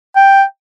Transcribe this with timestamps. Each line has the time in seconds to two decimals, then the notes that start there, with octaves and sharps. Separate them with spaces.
0.16 G5